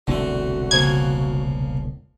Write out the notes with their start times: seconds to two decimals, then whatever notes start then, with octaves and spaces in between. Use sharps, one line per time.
0.07 E1 C2 D3 A3 C4 F#4
0.71 C#3 F3 A#3 G#6